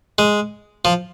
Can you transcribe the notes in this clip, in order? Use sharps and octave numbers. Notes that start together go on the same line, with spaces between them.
G#3
F3